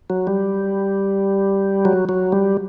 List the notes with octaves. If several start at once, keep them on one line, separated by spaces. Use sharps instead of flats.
F#3
G3
F#3
F#3
G3